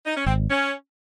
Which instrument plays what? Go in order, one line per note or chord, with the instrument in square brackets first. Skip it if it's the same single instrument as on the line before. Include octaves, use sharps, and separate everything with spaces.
[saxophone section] D#4
C#4
[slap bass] G#1 [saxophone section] C4
[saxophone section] C#4